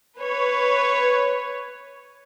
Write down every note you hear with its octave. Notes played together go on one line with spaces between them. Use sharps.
B4 C#5